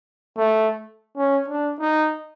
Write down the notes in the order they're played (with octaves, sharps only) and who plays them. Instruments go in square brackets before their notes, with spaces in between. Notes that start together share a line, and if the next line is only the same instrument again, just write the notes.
[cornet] A3
C#4
D4
D#4